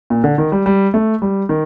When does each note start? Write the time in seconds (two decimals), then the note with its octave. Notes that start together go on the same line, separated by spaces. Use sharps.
0.10 A#2
0.24 D3
0.38 D#3
0.52 G3
0.66 G3
0.94 A3
1.22 G3
1.49 D#3